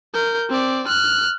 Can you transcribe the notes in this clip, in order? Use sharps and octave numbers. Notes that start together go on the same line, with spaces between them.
A#4 G6
C4 D5
F6 F#6